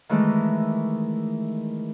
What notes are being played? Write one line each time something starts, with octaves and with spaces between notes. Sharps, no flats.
D#3 E3 G#3 A3